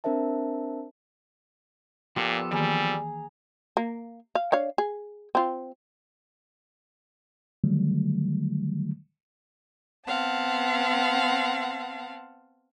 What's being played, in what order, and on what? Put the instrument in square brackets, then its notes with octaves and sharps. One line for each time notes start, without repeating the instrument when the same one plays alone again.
[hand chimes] C4 D4 A#4 C5 E5 A5
[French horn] A#2 [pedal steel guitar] F3 B3 A4 [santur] G4
[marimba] D#3 E3 A#3 [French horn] G3 [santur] G#4 A#5
[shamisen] A#3
F5
D4 C#5 F5
G#4
C4 F4
[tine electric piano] D3 D#3 F#3 G3 A3
[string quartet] B3 C4 F5 F#5 A5